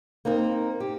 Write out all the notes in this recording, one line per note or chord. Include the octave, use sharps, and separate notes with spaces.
A#3 C4 D#4 A#4
G4